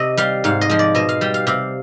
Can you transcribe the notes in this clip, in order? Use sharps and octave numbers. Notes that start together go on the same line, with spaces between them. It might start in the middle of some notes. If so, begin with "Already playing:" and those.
Already playing: C3 D#5
G3 F5
G#2 F5
D#5
F3 G#3
D5
B2 D#5
F5
G3 G5
F5
C3 F5